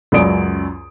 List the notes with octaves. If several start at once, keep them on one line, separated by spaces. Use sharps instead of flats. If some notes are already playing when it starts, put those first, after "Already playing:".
C#2 F#2 F#3 D5 D#6 D7